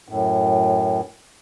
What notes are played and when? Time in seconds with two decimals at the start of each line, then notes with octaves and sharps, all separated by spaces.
0.08 F#2 A2